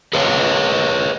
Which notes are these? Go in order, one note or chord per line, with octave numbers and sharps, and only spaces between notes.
G#4 B4 C#5 F5 G5